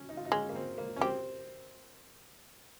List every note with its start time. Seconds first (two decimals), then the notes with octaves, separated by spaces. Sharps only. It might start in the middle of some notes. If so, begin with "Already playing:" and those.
Already playing: C#4
0.09 D#4
0.17 F4
0.25 D#4
0.32 G#3 C#4
0.49 A#3
0.55 C4
0.78 A#3
0.96 C#4
1.01 C4 G4